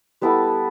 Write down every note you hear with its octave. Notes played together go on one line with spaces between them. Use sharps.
G3 B3 E4 A4